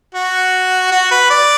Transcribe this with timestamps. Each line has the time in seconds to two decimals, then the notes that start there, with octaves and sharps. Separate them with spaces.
0.15 F#4
0.92 F#4
1.11 B4
1.30 D5